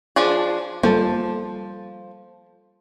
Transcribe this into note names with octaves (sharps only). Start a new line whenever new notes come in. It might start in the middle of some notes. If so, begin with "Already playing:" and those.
F3 D4 G#4
F3 G3 A3 A#3 A4 C5